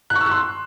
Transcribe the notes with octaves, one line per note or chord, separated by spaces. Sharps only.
F#6
C#6
E6
F#6
C6